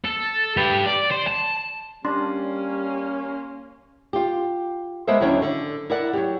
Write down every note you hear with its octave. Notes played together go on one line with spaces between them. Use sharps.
A4
G4 B4
D5
C5
A5
G3 A#3 C#4 D4 C6
F4 G4
G#3 A#3 B3 A4 C5 E5
D#2 D3 F#3 C#4 E4 C#5
D3
E4 A#4 D5 F#5
F#3 G4